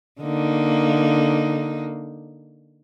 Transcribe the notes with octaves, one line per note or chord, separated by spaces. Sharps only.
D3 A#3 D#4